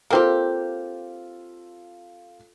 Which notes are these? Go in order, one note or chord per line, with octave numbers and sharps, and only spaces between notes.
A#3 C4 F4 G4 A4